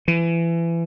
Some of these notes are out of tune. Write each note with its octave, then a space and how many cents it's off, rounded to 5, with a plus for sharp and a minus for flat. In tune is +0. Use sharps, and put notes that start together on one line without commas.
E3 +30